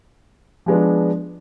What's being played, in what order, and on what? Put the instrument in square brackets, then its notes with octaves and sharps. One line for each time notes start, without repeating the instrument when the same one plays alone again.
[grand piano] F3 G#3 B3 D4